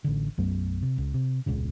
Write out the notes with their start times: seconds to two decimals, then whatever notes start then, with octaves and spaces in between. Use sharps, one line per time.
0.04 A1 D3
0.38 B1 F#2 A3 B3
0.82 C3
0.98 C#2
1.14 C3
1.46 E1 C#2 A#2 C#3